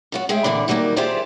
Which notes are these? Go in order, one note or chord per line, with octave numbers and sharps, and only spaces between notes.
F#2 F4 F#4
G#3 G#4 E5 G5
A#2 D3 E3 D4
D#3 F#3 G3 A3 A#3
F4 G4 G#4 C5 D5 E5